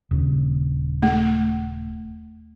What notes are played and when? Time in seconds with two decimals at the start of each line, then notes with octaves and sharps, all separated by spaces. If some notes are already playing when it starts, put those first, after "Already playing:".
0.11 D#1 C#3
1.02 A3